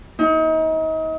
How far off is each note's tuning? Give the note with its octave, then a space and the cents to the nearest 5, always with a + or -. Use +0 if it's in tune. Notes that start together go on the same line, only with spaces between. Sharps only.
D#4 +35